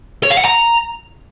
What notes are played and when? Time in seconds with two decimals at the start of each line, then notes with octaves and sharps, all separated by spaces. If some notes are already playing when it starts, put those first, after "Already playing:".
0.23 C#5
0.30 F5
0.38 F#5
0.45 A#5